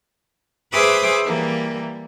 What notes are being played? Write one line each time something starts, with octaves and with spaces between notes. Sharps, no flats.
G#4 B4 C5 E5 D6 D#6
E3 G3 A#3